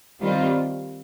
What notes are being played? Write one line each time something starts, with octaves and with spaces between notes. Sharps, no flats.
D#3 G3 C4 F4